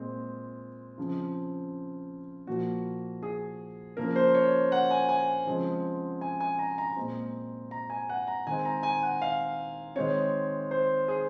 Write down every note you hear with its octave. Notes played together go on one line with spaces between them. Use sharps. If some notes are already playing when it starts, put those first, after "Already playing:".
Already playing: A#2 G#3 C4
C#3 F3 C4
A#2 F3 A#3 F#4
G#4
C#3 F3 A#3 A#4
C5
C#5
F#5
G#5
G#5
C#3 F3 G#3 C4
G#5
G#5
A#5
A#5
A#2 G#3 C4
A#5
G#5
F#5
A#5
D#3 G#3 C4 G#5
A#5
G#5
F#5
F5
D#3 G#3 C4 C#5
C5
G#4